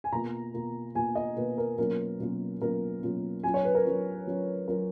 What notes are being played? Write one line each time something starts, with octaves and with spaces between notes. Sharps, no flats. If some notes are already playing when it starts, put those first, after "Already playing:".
G#5
B2 A#3 F4 A#5
B2 A#3 F4
B2 A#3 F4 G#5
D#5
B2 A#3 F4 B4
A#4
B2 F#3 A#3 C#4 F4 A#4
B2 F#3 A#3 C#4 F4
B2 F#3 A#3 C#4 F4 A#4
B2 F#3 A#3 C#4 F4
F#3 C#4 F4 G#5
C#5
B4
A#4
F#3 C#4 F4
F#3 C#4 F4
F#3 C#4 F4 A#4